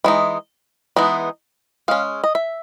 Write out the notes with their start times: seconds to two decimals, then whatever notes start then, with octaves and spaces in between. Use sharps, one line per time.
0.04 E3 G#3 D#4
0.96 E3 G#3 B3 D#4
1.88 G#3 C#4 F5
2.24 D#5
2.35 E5